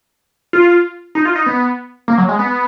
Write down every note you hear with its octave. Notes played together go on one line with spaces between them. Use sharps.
F4
D#4
F4
D#4
B3
A#3
F#3
G#3
B3